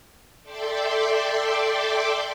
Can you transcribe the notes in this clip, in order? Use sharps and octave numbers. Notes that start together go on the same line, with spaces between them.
A4 D5 E5 G5 C6 D6